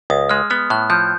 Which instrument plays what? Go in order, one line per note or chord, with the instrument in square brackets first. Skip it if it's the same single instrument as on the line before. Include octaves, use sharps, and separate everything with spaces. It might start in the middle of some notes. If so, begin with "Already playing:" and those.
[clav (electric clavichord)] C#2 [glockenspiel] D#6
[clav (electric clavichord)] G#3 [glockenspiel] F6
[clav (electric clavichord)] B3 [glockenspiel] F6
[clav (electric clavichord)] A2 [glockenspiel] F#6
[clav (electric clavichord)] F3 [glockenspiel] G6